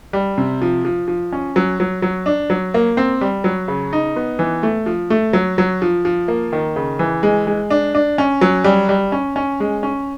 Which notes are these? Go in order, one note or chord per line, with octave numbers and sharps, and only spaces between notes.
G3
C3
F3
F3
F3
C#4
F#3
F#3
F#3
D4
F#3
A#3
C4
G3
F#3
C#3
D#4
B3
E3
A3
F3
A3
F#3
F#3
F3
F3
A#3
D#3
C#3
E3
G#3
G#3
D4
D4
C#4
F#3
G3
G3
C#4
C#4
G#3
C#4